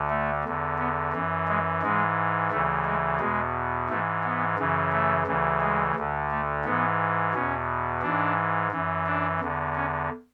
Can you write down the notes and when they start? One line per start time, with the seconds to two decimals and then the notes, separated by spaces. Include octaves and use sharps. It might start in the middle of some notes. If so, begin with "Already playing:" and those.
Already playing: D2 D3
0.10 A3
0.45 E2 D3
0.79 B3
1.13 F#2 E3
1.48 G#3
1.82 G#2 E3 G#3
2.51 D2 C#3 E3 A3
2.85 G#3
3.20 E2 B2 G#3
3.89 G#2 E3 A3
4.24 B3
4.58 F#2 C#3 E3
4.92 A3
5.27 D2 C#3 E3
5.61 G#3
5.96 D2 D3
6.31 A3
6.65 G#2 E3 B3
7.34 E2 B2 C#4
8.02 G#2 E3 D4
8.72 F#2 E3
9.06 D4
9.40 E2 D3
9.75 C#4